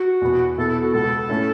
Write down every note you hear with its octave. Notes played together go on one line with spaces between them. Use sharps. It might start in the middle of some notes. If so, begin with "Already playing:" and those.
Already playing: F#4
E2 B2 B3
B2 B3 E4 A4
A4
F#4
C#2 B2 B3 A4
A2 A3 C#4 E4